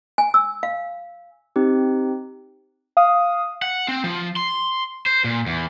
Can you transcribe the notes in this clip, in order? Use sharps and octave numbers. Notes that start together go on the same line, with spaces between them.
G#5
E6
F5
C4 D#4 G4
F5 D#6
F#5
C4
F3
C6
C5
A#2
E2